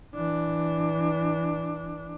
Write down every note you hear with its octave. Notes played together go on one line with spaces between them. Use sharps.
E3 D4